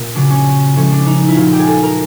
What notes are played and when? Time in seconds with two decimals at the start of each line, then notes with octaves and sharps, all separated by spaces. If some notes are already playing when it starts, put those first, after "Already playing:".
Already playing: A#2
0.15 C#3 F#3 D4
0.30 C#4
0.76 A2 F3 G#3 C#4
0.92 D4
1.06 D#4
1.28 E4
1.36 A#2 F#3 F4
1.53 G4
1.59 G#4
1.67 A4
1.83 A#4